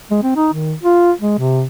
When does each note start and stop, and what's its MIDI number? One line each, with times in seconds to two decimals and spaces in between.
0.11 0.18 56
0.23 0.33 60
0.36 0.48 63
0.53 0.74 51
0.83 1.12 65
1.20 1.38 56
1.39 1.65 48